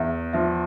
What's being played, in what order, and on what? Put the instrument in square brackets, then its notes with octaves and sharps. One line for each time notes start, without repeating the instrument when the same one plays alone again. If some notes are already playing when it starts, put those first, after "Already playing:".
Already playing: [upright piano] E2 [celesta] E5
[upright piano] F3 [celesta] E5